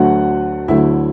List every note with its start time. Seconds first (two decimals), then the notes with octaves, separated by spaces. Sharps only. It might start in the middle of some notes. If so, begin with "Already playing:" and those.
Already playing: D2 D3 F#3 A3 F#4 F#5
0.68 D2 D3 F#3 A3 E4 E5